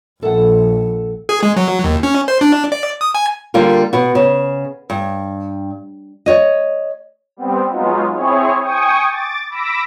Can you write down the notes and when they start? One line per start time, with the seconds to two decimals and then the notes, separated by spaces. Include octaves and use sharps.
0.23 A#1 A4 F#5
1.29 G#4
1.43 G#3
1.57 F#3
1.84 D#2
2.03 C#4
2.28 C5
2.41 D4
2.72 D5
3.01 D#6
3.15 G#5
3.54 D3 G3 A#3 F4 A#4
3.93 B2 F#4
4.15 C#3
4.90 G2
6.26 C#5 D#5
7.37 G3 B3 C4
7.69 F#3 G#3 B3 D#4 F4
8.14 C4 E4 G#4 C#5
8.62 G5 G#5 C#6 D#6
9.08 D6 A6
9.50 B5 D6 E6 A#6